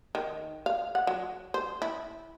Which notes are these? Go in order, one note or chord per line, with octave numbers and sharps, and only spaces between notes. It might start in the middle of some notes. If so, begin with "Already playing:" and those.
D#3
F5
F#5
F#3
C5
E4